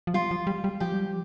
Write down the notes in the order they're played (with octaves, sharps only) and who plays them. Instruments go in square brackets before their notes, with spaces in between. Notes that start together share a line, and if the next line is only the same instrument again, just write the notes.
[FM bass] F3
[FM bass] G3 [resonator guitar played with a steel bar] F4
[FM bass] F3
G3
G3
[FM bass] F3 [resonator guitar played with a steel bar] G4
[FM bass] G3
F3